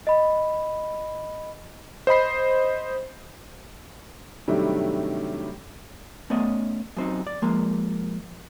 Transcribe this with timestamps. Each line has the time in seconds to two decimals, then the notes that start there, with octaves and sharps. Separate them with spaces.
0.07 D#5 B5
2.07 C5 D#5 B5 C7
4.48 G2 C3 D#3 F#3 G3 A3
6.30 A3 B3 C#4 D5 D#5
6.97 F#2 C4 D#4
7.27 D5
7.42 F3 G#3 A#3